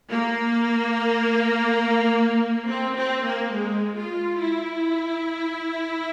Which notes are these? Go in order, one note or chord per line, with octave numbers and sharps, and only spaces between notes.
A#3
C4
C4
A#3
G#3
F4
E4